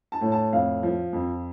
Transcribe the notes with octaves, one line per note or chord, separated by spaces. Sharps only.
A5
A2
A5
F2 F5
F3
F2